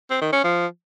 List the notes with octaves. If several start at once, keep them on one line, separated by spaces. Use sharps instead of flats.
C4
D#3
C#4
F3